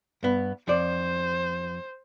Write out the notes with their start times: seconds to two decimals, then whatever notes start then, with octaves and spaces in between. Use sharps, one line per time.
0.23 G2 B3
0.68 F2 C5 D5